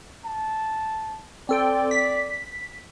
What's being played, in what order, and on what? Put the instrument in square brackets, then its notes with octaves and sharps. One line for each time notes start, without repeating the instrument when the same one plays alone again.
[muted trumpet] A5
[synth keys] C4 A4 G5 [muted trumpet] D5
[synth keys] B6